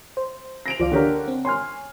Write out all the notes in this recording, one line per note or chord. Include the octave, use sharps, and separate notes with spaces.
C5
A#6 D7 F7
C#2 F3 D5 F5
D3 A#3 G4 A#4 C#5 D5
C4
C#5 G#5 C6 F6